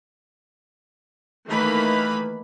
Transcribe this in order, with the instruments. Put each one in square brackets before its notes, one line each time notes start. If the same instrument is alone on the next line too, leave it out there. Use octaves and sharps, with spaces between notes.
[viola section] D#3 E3 A3 A#3 B4 B5